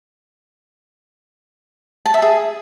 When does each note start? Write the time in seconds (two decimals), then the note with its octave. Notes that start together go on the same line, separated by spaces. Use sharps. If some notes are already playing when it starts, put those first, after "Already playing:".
2.06 A5
2.14 E5
2.22 G#4